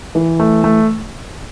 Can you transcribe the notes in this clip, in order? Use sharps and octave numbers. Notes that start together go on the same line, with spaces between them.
E3
A3
A3